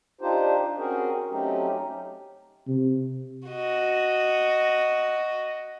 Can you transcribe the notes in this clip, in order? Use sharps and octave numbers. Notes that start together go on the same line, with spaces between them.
D4 D#4 F4 G4 C5
C4 C#4 F#4 G#4 A#4
F#3 A3 C4 C#4 D#4 G4
C3
F#4 D#5